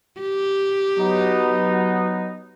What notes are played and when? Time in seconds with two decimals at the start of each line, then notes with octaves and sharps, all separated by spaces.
0.21 G4
0.98 F#3 B3 D#4